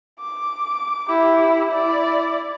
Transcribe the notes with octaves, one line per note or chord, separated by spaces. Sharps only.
D6
E4 G4
E4 D5